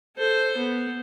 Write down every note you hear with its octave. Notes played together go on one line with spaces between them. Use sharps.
A4 C5
B3